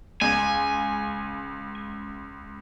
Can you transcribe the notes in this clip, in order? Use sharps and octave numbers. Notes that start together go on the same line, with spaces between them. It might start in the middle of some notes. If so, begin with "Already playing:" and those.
C#2 G#5